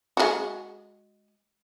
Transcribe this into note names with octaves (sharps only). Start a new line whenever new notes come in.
G#3 F4 F#4